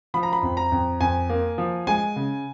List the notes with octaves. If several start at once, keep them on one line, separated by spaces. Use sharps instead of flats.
F3 B5
A#5
B5
F2
A#5
F2
F2 G#5
A#3
F3
G#3 G#5
C#3